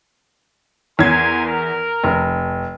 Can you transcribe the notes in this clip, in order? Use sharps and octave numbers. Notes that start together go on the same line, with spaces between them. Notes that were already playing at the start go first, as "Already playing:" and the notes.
E2 A#4 G#5 C6 G#6
A#4
F1